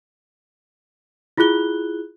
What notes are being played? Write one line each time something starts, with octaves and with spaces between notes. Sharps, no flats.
E4 F4 G#4 F#6 G7